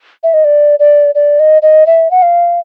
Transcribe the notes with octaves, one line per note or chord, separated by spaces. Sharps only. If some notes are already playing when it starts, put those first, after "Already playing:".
E5
D#5
D5
D5
D5
D#5
D#5
E5
F#5
F5